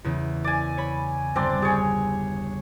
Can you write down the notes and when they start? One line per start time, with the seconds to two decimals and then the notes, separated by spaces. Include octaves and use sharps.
0.04 E2 C#3
0.44 D5 G#5
0.78 C#5 B5
1.36 G1 C4 D4 D5 C6
1.62 G4 G#4 C#5